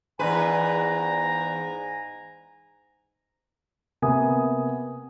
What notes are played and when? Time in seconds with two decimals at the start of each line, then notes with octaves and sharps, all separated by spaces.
0.19 E2 G#2 C3 B4 G#5 A#5
4.02 C3 A#3 B3 G#5 D#6